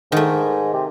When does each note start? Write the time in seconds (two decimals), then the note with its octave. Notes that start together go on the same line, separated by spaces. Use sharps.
0.12 G#2 D#3 A3
0.74 C3